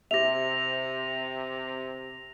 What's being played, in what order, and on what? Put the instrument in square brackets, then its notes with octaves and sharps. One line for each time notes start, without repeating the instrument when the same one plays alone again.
[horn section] C3 [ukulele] E4 G4 E5 [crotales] A#6 F7